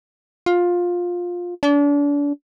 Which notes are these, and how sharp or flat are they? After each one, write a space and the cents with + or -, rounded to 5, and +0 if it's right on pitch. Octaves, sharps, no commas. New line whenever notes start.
F4 +15
D4 -35